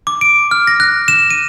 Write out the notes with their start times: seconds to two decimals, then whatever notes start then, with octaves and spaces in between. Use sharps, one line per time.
0.07 D6
0.21 D7
0.51 F6
0.67 A#6
0.80 F#6
1.08 E7
1.30 D#7